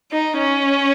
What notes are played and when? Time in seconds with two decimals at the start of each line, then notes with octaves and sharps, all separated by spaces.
0.11 D#4
0.39 C#4